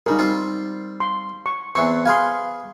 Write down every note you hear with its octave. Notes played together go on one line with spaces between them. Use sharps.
C#3 G3 D#4 A#4
G3 C4 F4
C6
C#6
E2 E3 C4 C#6
G#4 B4 F5 G#5 C6